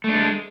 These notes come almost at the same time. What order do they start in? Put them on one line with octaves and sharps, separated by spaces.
A3 D4 G#3